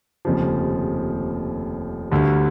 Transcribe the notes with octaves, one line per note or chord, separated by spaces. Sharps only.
F1 D#2 C#3 F3
D2 D3 G3